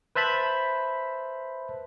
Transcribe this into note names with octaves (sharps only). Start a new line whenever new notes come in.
B4 C5 E5 A5 B5